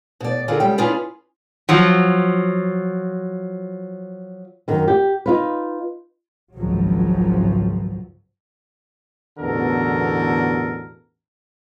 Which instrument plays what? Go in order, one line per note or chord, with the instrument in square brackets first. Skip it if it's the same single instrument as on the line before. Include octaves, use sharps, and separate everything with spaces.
[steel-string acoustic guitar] B2 D5
D3 F4 G#4 A#4
C#3 G3 G#3 G5
C#4 D4 E4 F4 G#4 B4
[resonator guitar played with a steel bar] F3 F#3
[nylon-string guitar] F#2 D#3
G4
D#4 F4 B4
[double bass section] G#1 C#2 G#2 F3 F#3
[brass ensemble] A1 E2 B2 D3 A4 A#4